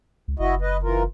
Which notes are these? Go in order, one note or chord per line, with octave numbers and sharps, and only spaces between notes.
C#2
F#1 E4 F#4 D#5
B4 D#5
E3 F4 A#4